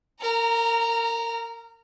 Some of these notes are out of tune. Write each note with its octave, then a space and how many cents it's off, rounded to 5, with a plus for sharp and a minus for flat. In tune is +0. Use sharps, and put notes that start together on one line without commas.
A#4 -25 A#5 +0